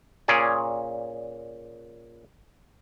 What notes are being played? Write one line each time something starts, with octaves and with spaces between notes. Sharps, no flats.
A#2 C#4 G#4 D5